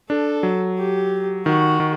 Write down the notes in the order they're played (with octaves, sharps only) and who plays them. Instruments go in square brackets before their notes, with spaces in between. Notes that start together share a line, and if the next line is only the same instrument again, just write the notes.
[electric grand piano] D4 [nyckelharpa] A4
[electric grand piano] F#3
[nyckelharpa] G4
[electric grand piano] D#3 [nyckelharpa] F#4
[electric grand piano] D#3